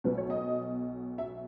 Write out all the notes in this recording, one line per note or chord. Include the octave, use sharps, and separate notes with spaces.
B1 B2 B4
C#5
D#5
E5